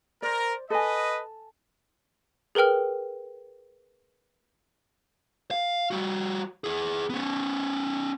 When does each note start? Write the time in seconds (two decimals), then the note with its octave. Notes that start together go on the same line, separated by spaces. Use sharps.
0.22 A#4 C5 D5
0.70 A4 B4 D#5 G#5
2.55 G#4 A#4 B4 G5 F6
5.51 F5
5.91 G3 F#4
6.64 E4 G#4
7.10 B3 C#4